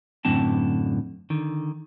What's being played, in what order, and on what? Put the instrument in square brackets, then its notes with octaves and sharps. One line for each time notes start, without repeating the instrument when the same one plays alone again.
[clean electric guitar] F#2 A2 D3 C4 A5
D3 D#3